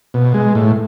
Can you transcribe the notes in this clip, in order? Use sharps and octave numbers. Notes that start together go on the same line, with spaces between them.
B2
G#3
A2